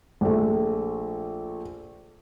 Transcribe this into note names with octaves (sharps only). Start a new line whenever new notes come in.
A#1 A3